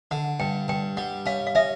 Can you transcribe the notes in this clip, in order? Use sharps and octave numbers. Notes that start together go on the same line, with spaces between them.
D3 F#5
G2 G5
G2 G5
G3 F#5
C#4 F5
F5
C#4 E5